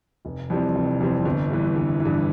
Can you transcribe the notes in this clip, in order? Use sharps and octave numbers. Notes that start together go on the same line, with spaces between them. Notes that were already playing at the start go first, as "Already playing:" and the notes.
F1
F2 E3 G3 C4
F1
F2 E3 G3 C4
G1
G2 E3
G1
E3
G2